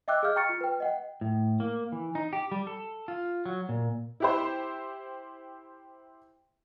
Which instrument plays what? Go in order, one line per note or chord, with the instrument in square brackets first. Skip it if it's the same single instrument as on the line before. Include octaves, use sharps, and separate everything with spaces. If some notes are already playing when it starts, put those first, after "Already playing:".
[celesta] D#5 E5 G5 D6 E6 F#6
G#4 D#5 F5 F6 G6
G5 A#5 C#6 F6 A6 C#7
F4
B4 G5
D#5 F#5 G5
[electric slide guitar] A2
A#3
E3
D#4
G4
G3
A4
F4
F#3
A#2
[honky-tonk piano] E4 G4 C5